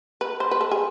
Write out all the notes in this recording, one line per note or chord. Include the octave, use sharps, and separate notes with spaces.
B4
C5
B4
A4
G#4